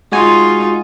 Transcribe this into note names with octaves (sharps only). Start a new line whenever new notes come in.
G#3 D#4 F4 F#4 G#5